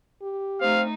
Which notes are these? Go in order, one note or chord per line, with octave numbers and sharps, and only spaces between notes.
G4
A3 C4 D#4 F5